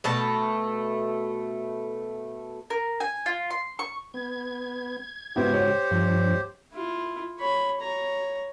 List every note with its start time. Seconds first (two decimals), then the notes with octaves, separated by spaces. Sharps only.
0.04 B2 A3 A5
2.70 A#4
3.00 G#5
3.26 F4
3.50 C6
3.79 C#6
4.14 B3 G#6
5.36 G#2 C#3 B3 E4 F#4 G4 C5
5.54 C#5
5.91 G2 F3 D4
6.73 E4 F4
7.39 C#5 B5
7.81 C#5 A#5